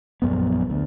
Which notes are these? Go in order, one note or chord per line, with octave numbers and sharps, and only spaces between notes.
A#1 F#2 B3
D2